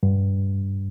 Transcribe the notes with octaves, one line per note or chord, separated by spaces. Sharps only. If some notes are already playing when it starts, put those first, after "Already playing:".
G2